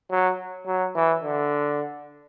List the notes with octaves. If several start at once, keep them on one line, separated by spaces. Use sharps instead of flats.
F#3
F#3
E3
D3